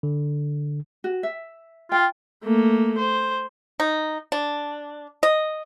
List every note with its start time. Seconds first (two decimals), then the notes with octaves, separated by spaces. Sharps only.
0.03 D3
1.04 F#4
1.23 E5
1.92 F4 G5
2.44 A3 A#3
2.98 C5
3.80 D#4
4.32 D4
5.23 D#5